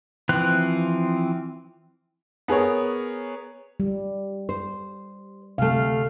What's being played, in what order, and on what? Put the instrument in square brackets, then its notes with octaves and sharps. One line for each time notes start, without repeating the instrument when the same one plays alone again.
[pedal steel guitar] E3 F3 C4 F#6
[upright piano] B3 G#4 A#4 C#5
[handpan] G3
[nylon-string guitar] C5
[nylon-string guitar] D2 A3 [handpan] C3 F5